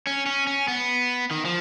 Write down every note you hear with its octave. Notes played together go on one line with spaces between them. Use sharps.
C#4
C#4
C#4
B3
D#3
F3